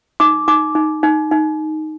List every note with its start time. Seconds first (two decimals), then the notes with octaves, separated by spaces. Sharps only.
0.20 D#4 D6
0.48 D#4 D6
0.75 D#4
1.03 D#4
1.31 D#4